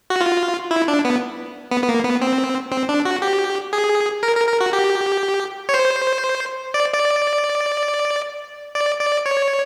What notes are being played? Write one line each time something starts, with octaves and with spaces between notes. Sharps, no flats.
F#4
F4
E4
D4
B3
B3
B3
A#3
B3
C4
C4
D4
F#4
G4
G#4
A#4
A#4
A#4
F#4
G4
C#5
C5
D5
D5
D5
D5
C#5